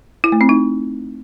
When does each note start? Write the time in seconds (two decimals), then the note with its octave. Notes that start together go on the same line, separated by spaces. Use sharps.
0.24 E4
0.32 A3
0.41 C4
0.49 D#4